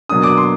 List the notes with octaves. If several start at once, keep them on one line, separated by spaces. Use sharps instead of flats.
B2 F#3 A#3 D4 D#6
D6
C6